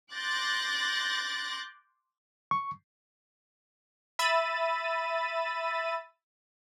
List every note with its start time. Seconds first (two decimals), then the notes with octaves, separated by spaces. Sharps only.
0.13 C6 D6 F#6 G6 A6 A#6
2.51 C#6
4.19 E5 B5 E6 A6 D#7